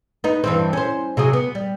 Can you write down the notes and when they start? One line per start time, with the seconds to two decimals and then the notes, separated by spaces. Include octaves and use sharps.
0.24 B3 D#4
0.44 G2 E3 C4
0.73 C#4 C5
1.17 C3 F#3 G#4
1.33 B3
1.55 G3